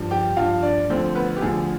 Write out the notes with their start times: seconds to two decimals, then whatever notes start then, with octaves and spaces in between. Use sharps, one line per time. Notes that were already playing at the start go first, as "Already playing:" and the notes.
Already playing: G2 F3
0.11 G4 G5
0.37 G2 F3 F4 F5
0.63 D4 D5
0.90 D2 D3 F3 C4 C5
1.15 B3 B4
1.36 G4
1.41 D2 D3 F3 G#4